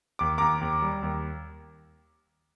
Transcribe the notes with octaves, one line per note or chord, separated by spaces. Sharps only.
D#2 D6
D#2 A#5 D6
D#2
G3
D#2